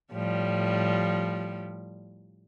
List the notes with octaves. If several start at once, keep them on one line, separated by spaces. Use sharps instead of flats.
A2 F3 G3